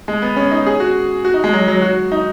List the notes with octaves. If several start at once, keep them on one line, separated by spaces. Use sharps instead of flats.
G#3
B3
C#4
D#4
G#4
F#4
F#4
D#4
G#3
F#3
F#3
F#4
D#4